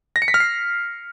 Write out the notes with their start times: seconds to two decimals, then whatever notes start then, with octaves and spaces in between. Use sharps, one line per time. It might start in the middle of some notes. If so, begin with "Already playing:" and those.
0.16 A#6
0.22 C#7
0.28 B6
0.34 F6
0.40 C7